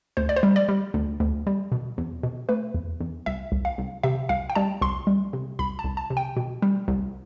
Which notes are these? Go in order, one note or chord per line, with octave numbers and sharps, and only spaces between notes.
D2 C5
D5
C5
G3
D5
G3
D2
D2
G3
B2
E2
B2
A3 B4
E2
E2
C2 E5
C2
F5
C2
C3 E5
C2 F5
G5
G3 A5
C2 C6
G3
C3
C2 B5
A5
C2
A5
C3
G5
B2
G3
C2